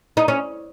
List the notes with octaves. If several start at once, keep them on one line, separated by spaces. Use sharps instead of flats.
D#4
C#4